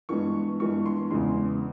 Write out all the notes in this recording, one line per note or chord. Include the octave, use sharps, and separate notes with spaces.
G2 E3 G#3 B3 C#6
G2 E3 G#3 B3 C#6
C6
E2 C#3 E3 G#3 C6